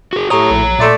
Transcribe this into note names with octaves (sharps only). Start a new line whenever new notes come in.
F#4 G#4
A2 G4 C#5 A#5 C#6 D#6
A#1
A#2 A3 D5 E5 C6